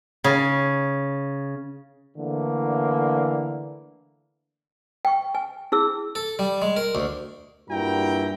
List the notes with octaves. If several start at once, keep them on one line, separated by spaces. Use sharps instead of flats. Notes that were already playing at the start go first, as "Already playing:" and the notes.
C#3
D3 E3 A3 A#3
G5 C#6
G#5
E4 G#4 E6
A4
G3
G#3
A#4
D2
G2 A#2 E4 F#4 G5 A#5